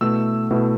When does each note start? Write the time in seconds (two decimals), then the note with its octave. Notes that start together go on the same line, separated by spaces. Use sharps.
0.01 B2 A3 E4 E6
0.51 B2 A3 E4